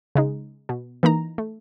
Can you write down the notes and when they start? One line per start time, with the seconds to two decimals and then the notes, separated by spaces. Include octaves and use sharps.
0.15 C#3 G#3 D#4
0.69 B2
1.03 E3 A#3 D#4 A#5
1.38 A3